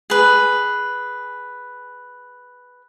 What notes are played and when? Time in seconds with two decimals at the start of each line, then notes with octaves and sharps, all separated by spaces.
0.10 G#4 B4